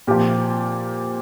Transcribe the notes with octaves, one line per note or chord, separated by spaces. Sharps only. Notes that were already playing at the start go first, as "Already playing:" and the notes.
A#2 F3 G4